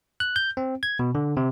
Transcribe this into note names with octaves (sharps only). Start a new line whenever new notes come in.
F#6
G6
C4
G#6
B2
D3
C3